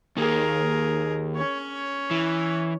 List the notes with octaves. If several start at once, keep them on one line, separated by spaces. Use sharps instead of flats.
D#2 A#3 G#4 A#4
C#4 C#5
E3